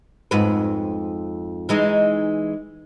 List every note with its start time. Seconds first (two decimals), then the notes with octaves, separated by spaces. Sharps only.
0.31 F2 G#2 B4
1.69 E3 G#3 D#4